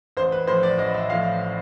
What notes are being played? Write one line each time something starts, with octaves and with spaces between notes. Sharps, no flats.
A1 C5
B4
A2 F3 C5
D5
A1 D#5
E5
A2 F3 F5